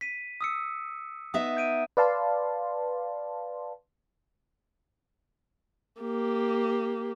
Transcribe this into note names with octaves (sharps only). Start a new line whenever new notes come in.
B6 D#7
D#6 E6 C#7
B3 D#4 E5 D#6
G6 D7 D#7
B4 D5 F5 A5 C6
A#3 G4